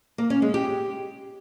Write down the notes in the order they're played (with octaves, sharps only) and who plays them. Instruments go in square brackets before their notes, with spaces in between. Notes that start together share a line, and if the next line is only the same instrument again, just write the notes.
[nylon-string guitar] A#3
C#4
G#3
G4